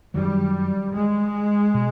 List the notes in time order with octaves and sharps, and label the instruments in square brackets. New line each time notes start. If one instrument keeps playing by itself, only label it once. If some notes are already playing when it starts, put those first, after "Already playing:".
[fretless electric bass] F#2 D#3 F#3 [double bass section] G3
[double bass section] G#3
[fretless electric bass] B2